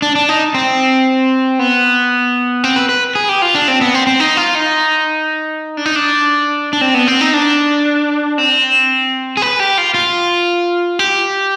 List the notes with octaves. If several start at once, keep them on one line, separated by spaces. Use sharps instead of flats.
D4
D4
D#4
C4
B3
C4
B4
B4
G#4
G4
F4
D4
C4
B3
C4
C4
D#4
F4
D#4
D4
D#4
D4
D4
C4
B3
C4
D#4
D4
C4
G#4
B4
G4
F4
F4
G4